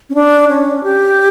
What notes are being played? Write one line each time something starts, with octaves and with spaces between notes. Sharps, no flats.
C#4
D4
C#4
G4